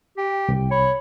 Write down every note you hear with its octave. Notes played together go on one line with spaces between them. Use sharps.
G4 G5
C2
C#5 B5